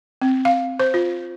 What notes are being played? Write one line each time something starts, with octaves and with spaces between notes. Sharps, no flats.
C4
F5
C5
F4